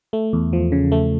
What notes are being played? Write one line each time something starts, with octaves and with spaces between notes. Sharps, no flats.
A3
E2
F3
C#3
A3